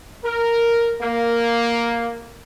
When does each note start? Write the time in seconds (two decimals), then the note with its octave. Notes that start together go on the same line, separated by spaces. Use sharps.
0.23 A#4
1.01 A#3